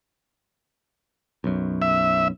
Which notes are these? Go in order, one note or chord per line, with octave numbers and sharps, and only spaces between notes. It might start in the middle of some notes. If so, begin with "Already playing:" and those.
B1 F#2
E5